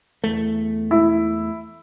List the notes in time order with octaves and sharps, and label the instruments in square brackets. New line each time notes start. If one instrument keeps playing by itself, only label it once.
[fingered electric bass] E2 A3
[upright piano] E4